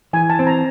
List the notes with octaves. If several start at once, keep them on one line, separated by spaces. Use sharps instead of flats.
E3 G#5
A5
C4
A#5